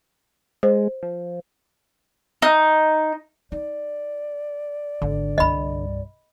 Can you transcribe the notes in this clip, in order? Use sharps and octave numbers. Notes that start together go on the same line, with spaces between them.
G#3 C5
F3
D#4
D#4 D5
G#1 D3
C2 G2 D#5 B5